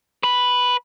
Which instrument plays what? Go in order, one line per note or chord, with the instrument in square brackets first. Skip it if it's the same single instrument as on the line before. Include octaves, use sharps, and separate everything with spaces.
[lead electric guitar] B4 B5